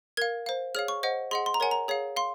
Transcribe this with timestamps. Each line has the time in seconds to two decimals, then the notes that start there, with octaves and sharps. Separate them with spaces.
0.17 A#4 F5 G#6
0.46 C5 F5
0.75 G#4 C#5 F5 F6
0.88 C#6
1.03 C5 D#5 F#5
1.31 G#4 D#5 F#5 C6
1.46 C6
1.54 A#5
1.60 A#4 C#5 F#5 G#5
1.71 A#5
1.88 G#4 C#5 F5
2.16 F5 C6